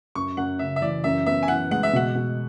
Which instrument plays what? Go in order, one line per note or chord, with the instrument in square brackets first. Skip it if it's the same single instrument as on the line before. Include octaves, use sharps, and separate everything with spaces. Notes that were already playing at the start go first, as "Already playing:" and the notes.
[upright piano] F#2 [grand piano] C#6
[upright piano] F#2 [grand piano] F#5
[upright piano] C#3 [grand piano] E5
[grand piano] E5
[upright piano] E3 [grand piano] D5
[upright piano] F#2 [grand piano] E5
[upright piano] B3 [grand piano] E5
[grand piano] G#5
[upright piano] E3 [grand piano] F#5
[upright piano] G#3 [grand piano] F#5
[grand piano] E5
[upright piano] B2 [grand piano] F#5
[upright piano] B2